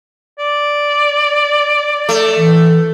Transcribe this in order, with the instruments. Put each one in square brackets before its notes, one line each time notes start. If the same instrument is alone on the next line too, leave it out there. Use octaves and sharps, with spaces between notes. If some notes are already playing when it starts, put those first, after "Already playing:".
[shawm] D5
[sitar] A3
[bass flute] E3